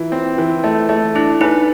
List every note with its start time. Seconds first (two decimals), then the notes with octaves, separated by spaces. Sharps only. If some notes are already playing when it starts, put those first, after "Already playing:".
Already playing: E3 F4
0.12 C4
0.38 E3
0.64 A3
0.89 A3
1.15 D4 E4
1.41 D#4 B4